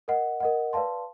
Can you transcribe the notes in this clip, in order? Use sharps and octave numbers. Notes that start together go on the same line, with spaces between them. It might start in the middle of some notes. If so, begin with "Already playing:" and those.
A#4 D#5 F#5
A#4 D#5 F#5
B4 D5 F5 A5 C6